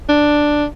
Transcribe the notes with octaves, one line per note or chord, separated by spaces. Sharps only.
D4